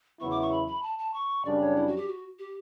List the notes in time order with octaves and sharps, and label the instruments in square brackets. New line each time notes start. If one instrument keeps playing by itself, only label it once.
[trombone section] E2 C#3 F#3 B3 E4 [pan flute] C#6
[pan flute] D6
C#6
B5
B5
A5
A5
C#6
[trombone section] F#2 C#3 G3 D4 [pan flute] D5
[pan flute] C#5
E4
F#4
G4
F#4
G4